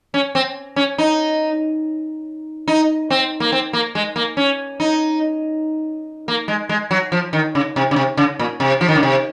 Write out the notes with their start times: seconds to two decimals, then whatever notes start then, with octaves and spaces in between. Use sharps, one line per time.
0.14 C#4
0.35 C4
0.76 C#4
0.98 D#4
2.68 D#4
3.10 C4
3.40 A#3
3.52 C4
3.73 A#3
3.95 G#3
4.16 A#3
4.37 C#4
4.80 D#4
6.28 A#3
6.48 G#3
6.69 G#3
6.91 F#3
7.12 F3
7.33 D#3
7.55 C#3
7.76 C3
7.91 C#3
7.96 C3
8.17 C#3
8.39 A#2
8.60 C3
8.81 F3
8.88 D#3
8.95 C#3
9.03 C3